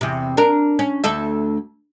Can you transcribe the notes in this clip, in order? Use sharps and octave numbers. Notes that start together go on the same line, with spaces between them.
E2 C3
D4 A#4
C#4
D2 A4 E5